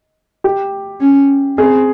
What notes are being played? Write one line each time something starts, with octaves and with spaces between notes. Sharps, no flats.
G4
C#4
C4 G#4